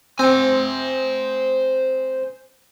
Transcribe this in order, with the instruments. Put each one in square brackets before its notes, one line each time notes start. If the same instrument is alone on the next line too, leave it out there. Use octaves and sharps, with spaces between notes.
[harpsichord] C4 [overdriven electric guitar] C5 G#5